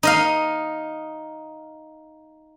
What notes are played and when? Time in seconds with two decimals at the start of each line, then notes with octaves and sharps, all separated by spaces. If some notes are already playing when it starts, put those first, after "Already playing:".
0.03 D#4 D#5 F5